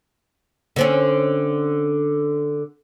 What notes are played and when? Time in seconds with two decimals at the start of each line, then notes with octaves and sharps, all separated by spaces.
0.76 D3 C4 C#4